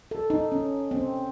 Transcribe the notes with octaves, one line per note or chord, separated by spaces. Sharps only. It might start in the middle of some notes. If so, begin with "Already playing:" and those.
A4
D#4
C#4
C4